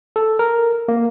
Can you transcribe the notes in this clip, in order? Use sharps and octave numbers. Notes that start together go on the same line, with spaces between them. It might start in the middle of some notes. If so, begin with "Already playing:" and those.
A4
A#4
A#3